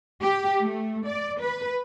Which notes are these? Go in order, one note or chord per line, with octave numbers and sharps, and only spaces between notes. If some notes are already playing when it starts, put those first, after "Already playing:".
G4
A3
D5
B4